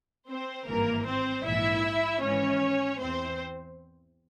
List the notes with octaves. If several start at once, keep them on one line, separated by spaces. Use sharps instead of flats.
C4 C5
G#1 G2 E3 A#3 A#4
C4 C5
A#1 G#2 E3 E4 E5
G#1 G#2 E3 C#4 C#5
E2 E3 C4 C5